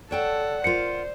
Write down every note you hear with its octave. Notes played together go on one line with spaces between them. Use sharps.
A4 C#5 D5 F#5 G5 A5
F4 A#4 C5 F#5 C#7